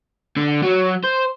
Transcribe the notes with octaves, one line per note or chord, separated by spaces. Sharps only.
D3
F#3
C5